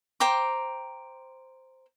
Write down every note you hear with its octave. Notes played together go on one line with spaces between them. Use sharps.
C5 G5 A#5 D6